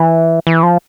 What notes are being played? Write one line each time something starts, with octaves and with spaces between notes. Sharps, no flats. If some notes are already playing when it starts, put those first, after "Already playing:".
Already playing: E3
E3
F3